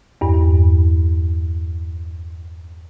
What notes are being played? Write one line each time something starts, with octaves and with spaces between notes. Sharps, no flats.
E2 G2